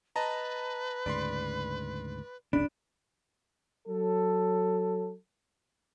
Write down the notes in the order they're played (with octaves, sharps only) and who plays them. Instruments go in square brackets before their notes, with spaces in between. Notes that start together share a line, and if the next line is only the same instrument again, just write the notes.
[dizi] B4 [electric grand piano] D#5 A5 A#5
[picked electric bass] D2 G#2 C#3 [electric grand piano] D5 B5 C6
[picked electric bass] F#1 C2 C#3 [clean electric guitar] D4 [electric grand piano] B5
[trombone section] F#3 A4